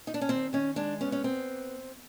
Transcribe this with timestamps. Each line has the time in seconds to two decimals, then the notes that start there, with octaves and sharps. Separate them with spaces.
0.07 D#4
0.14 D4
0.21 C#4
0.29 D#3 C4
0.53 D#3 C#4
0.76 G#3 D4
1.01 B3 C#4
1.12 C#4
1.24 B3 C4